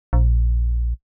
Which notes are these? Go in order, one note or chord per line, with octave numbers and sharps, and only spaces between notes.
A#1